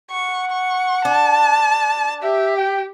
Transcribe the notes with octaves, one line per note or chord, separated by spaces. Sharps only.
F#5 C#6
C#6
D4 A5
G4 E5
G5